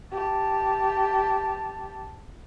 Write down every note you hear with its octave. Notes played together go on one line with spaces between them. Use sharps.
G4 A5